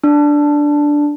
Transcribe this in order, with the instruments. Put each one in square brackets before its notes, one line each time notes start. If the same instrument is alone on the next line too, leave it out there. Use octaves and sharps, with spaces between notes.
[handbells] D4